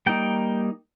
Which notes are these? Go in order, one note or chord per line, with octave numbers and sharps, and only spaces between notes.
G3 A#3 D#4 G5